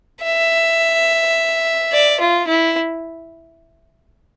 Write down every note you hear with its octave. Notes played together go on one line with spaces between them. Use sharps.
E5
D5
F4
E4